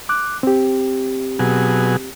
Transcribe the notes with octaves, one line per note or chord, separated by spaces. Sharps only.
D6 F#6
C4 G4
B2 F#3 G#4